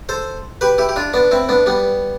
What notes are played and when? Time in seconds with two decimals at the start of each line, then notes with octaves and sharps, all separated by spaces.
0.09 A4 C5
0.61 G4 B4
0.78 E4 G4
0.89 G4
0.96 D4 F4
1.13 B3 D4
1.31 C4 E4
1.49 B3 D4
1.66 G3 B3